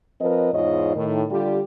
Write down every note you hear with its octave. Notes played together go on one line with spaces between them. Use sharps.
F3 C4 A#4 B4 D#5
E2 G#2 F4 C#5 D#5
A2 D#3
D3 G3 F4 G4